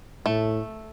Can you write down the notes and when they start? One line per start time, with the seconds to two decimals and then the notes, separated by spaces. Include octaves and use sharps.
0.26 A2 A3